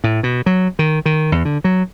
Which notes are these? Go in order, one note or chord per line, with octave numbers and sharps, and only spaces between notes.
A2
B2
F#3
D#3
D#3
E2
D3
F#3